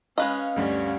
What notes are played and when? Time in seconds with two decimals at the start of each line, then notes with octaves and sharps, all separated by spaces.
0.18 G#3 C#4 B4 D#5 F5
0.56 D2 G2 G3 C#4